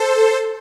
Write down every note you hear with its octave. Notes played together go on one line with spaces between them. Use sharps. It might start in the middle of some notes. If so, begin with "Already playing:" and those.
Already playing: A4 C5